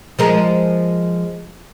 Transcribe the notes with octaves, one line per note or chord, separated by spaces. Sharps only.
F3 G#3 A#4